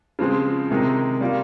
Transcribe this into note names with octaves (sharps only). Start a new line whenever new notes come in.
C#3 F3 G#3 C4
C3 D#3 G#3 D#4
G3 A#3 F4